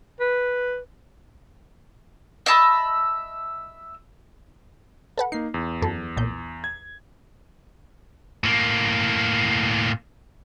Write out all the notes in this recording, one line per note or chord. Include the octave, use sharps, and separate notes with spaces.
B4
D#5 E5 A5 B5
A4 B4 F#5
A#3 D#4 C7
E2
F#2 A4
B1 A#2 G6
G#6
A2 A#3